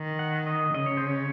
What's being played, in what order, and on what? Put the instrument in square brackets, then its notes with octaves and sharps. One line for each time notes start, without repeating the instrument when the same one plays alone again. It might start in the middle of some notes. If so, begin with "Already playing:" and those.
Already playing: [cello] D#3
[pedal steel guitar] F#5
D#5
[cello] C#3 [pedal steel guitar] D#5
[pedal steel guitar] C#5
C5
C#5